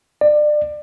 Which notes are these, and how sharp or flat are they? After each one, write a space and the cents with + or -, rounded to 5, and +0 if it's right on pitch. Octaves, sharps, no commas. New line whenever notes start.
D5 +30